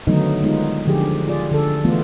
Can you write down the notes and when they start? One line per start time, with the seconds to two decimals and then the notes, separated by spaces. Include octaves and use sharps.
0.07 D3 D#3 F#3 A3 B3 D#4
0.43 G#3 B3 D#4 F4
0.87 D3 F3 G4 G#4
1.28 F4 G#4 D5
1.51 D3 A4
1.84 E3 A3 B3 F4